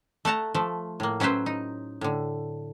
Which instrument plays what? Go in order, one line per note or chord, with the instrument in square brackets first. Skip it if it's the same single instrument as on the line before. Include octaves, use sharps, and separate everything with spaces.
[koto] A3 F#5 A5 A#5
F3 A3
A2 A#3
F#3 C#4 E4 B4 C5
D#4
A2 D3